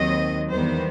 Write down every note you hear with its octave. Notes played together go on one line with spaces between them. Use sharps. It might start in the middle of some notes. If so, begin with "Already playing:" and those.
Already playing: D#2 D#3 F#3 C4 D#5
E2 D#3 G3 B3 C5